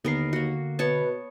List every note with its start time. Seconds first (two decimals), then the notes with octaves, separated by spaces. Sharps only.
0.05 D#2 D3 B3 A#4 C7
0.33 A#3 F#4
0.79 B2 B3 B4 C#5 A5